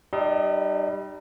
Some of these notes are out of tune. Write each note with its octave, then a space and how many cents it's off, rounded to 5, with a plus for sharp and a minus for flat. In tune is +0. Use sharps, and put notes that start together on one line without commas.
G3 -10 D#4 -40 D#5 +35